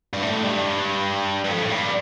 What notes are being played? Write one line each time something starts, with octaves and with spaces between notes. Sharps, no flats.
G2
A2
G2
G2
F2
A2
G2